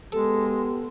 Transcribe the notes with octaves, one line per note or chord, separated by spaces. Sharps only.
G#3 B3 G4 A4